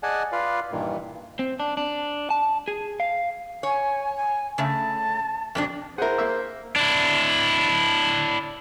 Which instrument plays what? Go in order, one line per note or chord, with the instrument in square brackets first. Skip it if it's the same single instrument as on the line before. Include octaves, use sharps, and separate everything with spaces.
[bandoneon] G#4 D5 D#5 F#5 G#5 A5
F4 B4 D5 F5
G2 A#2 D#3 E3
[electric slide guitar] C4
D4
D4
A5
G#4
F5
[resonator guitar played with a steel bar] C#5 [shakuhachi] G#5
[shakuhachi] G#5
[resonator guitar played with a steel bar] C#3 A3 [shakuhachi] A5
[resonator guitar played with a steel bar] F2 B2 D4
[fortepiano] E4 F#5 [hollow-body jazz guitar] G#4 A#4 [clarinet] C5
[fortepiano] A#3 E5
[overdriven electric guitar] D4 E4